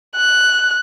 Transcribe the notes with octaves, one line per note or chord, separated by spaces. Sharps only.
F#6